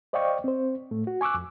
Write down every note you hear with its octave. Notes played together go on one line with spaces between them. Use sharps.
C5 D5 D#5 F5 G5 C#6
C4 C5
A2 A3
F#4
G#5 C#6 D6 E6 F#6
F2